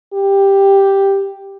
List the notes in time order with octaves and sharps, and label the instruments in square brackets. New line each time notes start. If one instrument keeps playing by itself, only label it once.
[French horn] G4